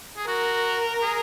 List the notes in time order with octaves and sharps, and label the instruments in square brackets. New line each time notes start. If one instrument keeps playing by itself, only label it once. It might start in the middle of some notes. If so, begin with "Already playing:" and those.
[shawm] G#4
[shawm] F#4 [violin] A#4
[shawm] G#4